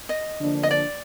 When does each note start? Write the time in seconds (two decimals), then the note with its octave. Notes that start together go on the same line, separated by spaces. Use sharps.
0.09 D#5
0.39 D3 F3 A#3 D4
0.63 D#5
0.71 D5